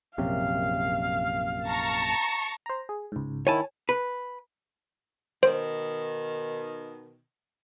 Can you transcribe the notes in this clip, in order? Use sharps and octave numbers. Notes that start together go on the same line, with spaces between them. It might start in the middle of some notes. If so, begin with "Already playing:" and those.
A#1 F#2 C3 F5
A5 A#5 C#6
C5 A#5
G#4
C#2 G#2
D#3 E4 C#5 G#5 A5
B4
B2 D#3 C5